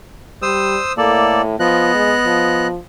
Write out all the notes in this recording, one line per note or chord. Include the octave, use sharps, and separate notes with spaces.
G3 C5 D#6 E6
A2 A#3 A4 D5
F3 B3 D#5 F#6
G#3
F3